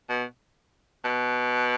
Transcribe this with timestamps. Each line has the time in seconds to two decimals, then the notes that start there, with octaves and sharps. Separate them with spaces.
0.09 B2
1.05 B2